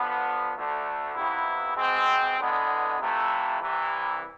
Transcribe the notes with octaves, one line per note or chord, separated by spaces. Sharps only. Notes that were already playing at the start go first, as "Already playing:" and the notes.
Already playing: D3 F3 B3
D2 D3 A3
F2 C3 E3 B3 E4
B2 G#3 C4
E2 D3 G#3 B3
F2 C3 E3 A3
C2 C3 E3